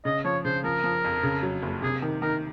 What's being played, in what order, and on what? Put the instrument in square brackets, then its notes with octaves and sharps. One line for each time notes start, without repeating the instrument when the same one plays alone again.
[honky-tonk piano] C#3 [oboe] D#5
[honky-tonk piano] F3 [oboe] C#5
[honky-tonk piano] C#3 [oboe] C5
[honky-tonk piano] F3 [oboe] A#4
[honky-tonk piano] F3
F2
C#3
F#3
F#1
[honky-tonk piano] C3 [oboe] G#4
[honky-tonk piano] D#3
[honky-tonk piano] D#3 [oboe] A#4